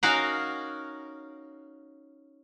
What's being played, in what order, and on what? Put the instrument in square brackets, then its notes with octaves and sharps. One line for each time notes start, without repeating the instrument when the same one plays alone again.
[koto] C#4 D#4 F#4 A#4 F5 F#5